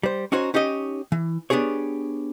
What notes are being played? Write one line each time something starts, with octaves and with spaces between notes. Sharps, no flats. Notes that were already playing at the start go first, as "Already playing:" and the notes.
G3 C5
C#4 D#4 F#4 C5 C#5
C#4 D#4 G4 C#5 D#5
E3
B3 D4 G4 G#4 C#5